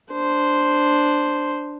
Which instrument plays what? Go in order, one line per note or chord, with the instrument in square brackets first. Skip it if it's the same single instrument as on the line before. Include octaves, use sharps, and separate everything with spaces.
[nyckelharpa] D4 C5